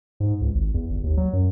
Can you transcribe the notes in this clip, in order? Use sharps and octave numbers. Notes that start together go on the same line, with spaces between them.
G#2
C#2
G#1
E2
G1
D#2
F#3
F#2